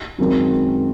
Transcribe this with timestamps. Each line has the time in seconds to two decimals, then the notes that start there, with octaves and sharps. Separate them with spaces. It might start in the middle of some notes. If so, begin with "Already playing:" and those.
0.18 F#2 D#3 G#3 C4